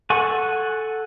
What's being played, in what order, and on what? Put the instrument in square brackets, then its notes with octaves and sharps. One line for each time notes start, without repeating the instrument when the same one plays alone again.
[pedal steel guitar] A4 F#5 G#5 C#6